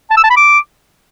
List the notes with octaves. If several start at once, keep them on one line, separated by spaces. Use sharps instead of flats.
A5
E6
A5
B5
D6